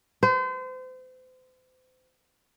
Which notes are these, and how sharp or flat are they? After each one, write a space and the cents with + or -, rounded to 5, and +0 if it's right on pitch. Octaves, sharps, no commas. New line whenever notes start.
C5 -35